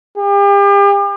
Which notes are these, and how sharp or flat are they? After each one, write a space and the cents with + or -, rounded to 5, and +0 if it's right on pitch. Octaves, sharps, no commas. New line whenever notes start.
G4 +40